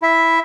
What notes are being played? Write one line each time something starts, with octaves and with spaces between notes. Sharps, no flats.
E4 E5